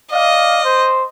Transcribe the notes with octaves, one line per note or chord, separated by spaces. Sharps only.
D5 D#5 F5
C5